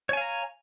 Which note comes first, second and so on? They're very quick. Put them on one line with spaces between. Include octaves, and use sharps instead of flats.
C#5 G#5 F5 A#5